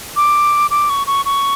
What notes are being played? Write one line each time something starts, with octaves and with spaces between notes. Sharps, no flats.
D6
D6
C#6
C#6
C#6